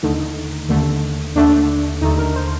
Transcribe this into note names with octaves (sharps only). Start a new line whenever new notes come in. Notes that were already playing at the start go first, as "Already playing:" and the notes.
D#2 D3 A3 D#4
D#2 D3 A3
D#2 D3 A3 D4
D#2 D3 A3 D#4
A#4
C5